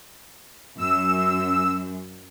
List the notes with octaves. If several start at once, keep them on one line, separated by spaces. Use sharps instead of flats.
F#2 E6